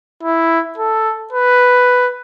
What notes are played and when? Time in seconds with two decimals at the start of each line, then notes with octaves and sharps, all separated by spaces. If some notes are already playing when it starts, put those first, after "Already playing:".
0.23 E4
0.77 A4
1.33 B4